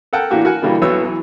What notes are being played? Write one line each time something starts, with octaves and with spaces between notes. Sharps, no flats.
A4 A#4 F#5 G5 A5
A2 E3 A#3 D4 F#4 G4
F#4 A#4 F#5 G#5
B2 D3 E3 G3 A#3 E4
B1 B2 B3 E4 C#5 E6
E3 F#3